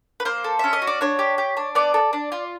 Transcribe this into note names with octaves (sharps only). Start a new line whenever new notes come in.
B4
A#3 C5
A4
C#4 E5
D#5
F#4
D5
D4 C#5
G4
G4
D4
B3 D5
A4
D4
F4